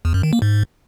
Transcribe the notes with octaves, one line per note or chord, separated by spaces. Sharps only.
E2
F#2
D#3
A#3
G#2